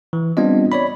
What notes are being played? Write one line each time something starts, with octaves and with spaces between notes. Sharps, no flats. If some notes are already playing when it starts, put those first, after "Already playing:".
E3
G3 B3 C4 D4 F4 D#5
C#5 D5 B5